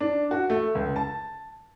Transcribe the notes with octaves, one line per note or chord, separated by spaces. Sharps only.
D4
F#4
A3
C#2
A5